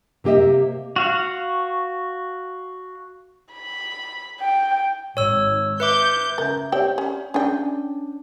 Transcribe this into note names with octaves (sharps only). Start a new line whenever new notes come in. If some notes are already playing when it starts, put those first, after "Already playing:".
C3 A#3 G4 D#5 E5
F#4 F5 C#6
B5
G5
G#1 C#5 E6
B4 E5 D6 G6
C#3 A#4 E5 G6
C4 G4 C#5 D5 E5 G5
C#4
C#4 D4 G#4 D5 G5